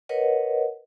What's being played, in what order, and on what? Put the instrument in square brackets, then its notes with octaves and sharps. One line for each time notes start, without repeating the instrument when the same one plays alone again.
[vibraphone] A#4 B4 C#5 D#5 F#5